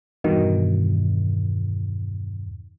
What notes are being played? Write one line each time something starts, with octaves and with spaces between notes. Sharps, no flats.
E2 G2 B2 D#3